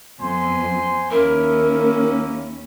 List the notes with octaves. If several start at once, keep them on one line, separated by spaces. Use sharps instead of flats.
F2 B3 C5 G#5 C6
D#2 A#3 C#4 E4 A#4